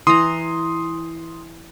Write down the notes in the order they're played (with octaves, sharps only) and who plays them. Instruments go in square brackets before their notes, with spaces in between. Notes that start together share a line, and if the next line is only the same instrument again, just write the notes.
[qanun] E3 A#5 [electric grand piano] C6 D#6